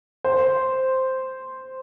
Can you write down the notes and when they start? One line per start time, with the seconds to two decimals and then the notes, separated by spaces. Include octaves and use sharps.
0.24 C5